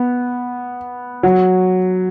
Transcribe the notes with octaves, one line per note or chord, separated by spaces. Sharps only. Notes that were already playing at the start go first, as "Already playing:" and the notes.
Already playing: B3
F#3